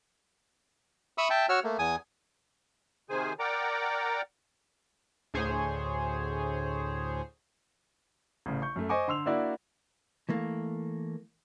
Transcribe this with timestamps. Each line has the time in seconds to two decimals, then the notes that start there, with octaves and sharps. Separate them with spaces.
1.18 E5 B5 C#6 D#6 E6
1.30 E5 G5 A5
1.49 F#4 C#5 E6 F6
1.64 A3 A#3
1.79 E2 G#5 D#6
3.10 C3 D#3 G#4 C5 G#5
3.39 A#4 D5 F#5 G5 A#5 D6
5.34 D2 A2 G#4 C5 C#5 G#5
8.46 A1 C#3
8.62 C#6 G6
8.76 F#2 A3
8.89 C5 D#5 G#5 C#6 D6
9.08 D3 C6 E6 F7
9.26 A#3 D4 E4 F#4 D5 E5
10.29 E3 A3 A#3